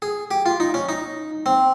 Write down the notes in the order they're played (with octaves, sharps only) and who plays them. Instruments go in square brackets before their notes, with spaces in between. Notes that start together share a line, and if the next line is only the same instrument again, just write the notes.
[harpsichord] G#4
G4
F4
D#4
C#4
D#4
C4